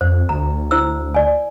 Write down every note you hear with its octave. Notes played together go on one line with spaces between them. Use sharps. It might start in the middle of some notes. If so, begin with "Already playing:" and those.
F2 C5
D2 A#5
E4 C5 E6
D5 G#5